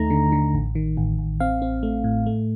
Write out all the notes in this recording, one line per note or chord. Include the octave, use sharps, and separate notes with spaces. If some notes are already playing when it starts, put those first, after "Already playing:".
Already playing: D#2 A3 D#4 A#5
D3
D3
A1
D#3
A1
A1
C4 F5
C4
A3
A2
A3